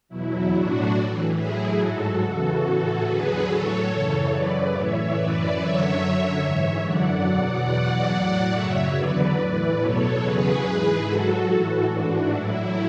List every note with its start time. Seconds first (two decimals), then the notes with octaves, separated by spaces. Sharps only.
0.09 E2 B2 F#3 E4
0.51 A2 F#3 D4 F#4
0.94 A2 E3
1.36 A2 F#3 E4 G#4
1.78 G#2 F#3 F#4 A4
2.20 E2 C#3 E3
2.62 A2 E3
3.04 E2 D3 F#3 G#4 B4
3.46 A2 F#3 A4 C#5
3.88 F#2 C#3 E3
4.30 F#2 C#3 F#3 B4 D5
4.72 A2 E3 C#5 E5
5.14 F#2 E3 B4 D5
5.57 F#2 D3 F#3 C#5 E5
5.99 F#2 D3 F#3
6.42 G#2 E3
6.83 F#2 D3 F#3 D5 F#5
7.26 E2 B2 F#3
7.67 E2 B2 F#3 D5 F#5
8.09 A2 F#3
8.52 F#2 C#3 F#3 C#5 E5
8.94 E2 D3 F#3 B4 D5
9.36 A2 E3
9.78 E2 B2 F#3 A4 C#5
10.20 E2 C#3 F#3 G#4 B4
10.62 G#2 E3
11.04 G#2 F#3 F#4 A4
11.46 A2 E3
11.88 G#2 E3 D4 F#4
12.30 A2 F#3 E4